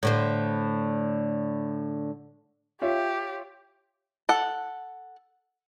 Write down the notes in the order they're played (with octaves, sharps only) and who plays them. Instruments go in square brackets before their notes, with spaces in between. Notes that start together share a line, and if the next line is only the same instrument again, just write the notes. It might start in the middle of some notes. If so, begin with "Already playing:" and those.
[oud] A2 D3 C5
[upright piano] F4 C#5 E5 [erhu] G4
[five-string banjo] A4 F#5